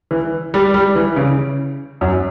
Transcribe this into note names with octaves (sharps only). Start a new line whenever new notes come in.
E3
G3
G3
E3
C#3
F#2